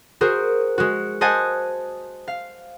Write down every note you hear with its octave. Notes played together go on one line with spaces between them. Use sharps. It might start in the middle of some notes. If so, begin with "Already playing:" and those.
F#4 G#4 A#4 C5
G#3 F#4
C5 D#5 F#5 G#5 A5
F5